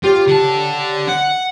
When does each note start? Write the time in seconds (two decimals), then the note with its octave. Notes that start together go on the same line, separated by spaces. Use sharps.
0.04 F4 G4 C#5
0.28 D3 A5
1.08 F#5